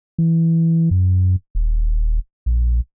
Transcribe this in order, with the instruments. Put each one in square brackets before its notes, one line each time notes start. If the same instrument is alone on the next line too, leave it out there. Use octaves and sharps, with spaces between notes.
[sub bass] E3
F#2
D#1
A#1